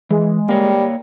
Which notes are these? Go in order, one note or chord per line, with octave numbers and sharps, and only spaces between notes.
E3 G#3
G3 A#3 A#4 C#5